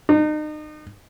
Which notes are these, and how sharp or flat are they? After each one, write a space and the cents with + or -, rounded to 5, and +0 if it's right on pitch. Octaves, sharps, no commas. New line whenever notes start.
D#4 -35